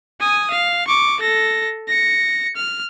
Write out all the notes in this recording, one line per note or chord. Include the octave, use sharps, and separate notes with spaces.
G#5 D#6
F5
C#6 D6
A4 A#6
A#6 C#7
F6